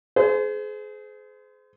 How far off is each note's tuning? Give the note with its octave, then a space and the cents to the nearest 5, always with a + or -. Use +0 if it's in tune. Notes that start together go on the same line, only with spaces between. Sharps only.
G#4 +30 C5 -30